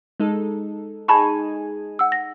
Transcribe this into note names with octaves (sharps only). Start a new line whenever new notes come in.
G#3 D#4 A4
D#4 G#4 G#5 A5 B5 C#6
F#5 E6
A#6